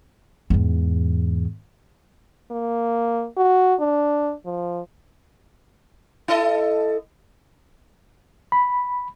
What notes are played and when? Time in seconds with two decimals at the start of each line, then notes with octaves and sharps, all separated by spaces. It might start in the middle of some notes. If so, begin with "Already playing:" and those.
0.50 E2 G#2
2.51 A#3
3.37 F#4
3.80 D4
4.45 F3
6.28 E4 A4 D#5
8.52 B5